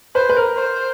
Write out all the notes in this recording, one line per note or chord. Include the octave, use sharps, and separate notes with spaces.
B4 C5
B4
A#4
C5